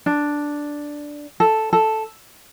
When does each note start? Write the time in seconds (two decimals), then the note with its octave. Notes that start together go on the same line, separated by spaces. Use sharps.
0.06 D4
1.40 A4
1.73 A4